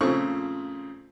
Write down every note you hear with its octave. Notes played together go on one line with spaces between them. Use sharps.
A#2 C#3 F3 A3 C4 C#6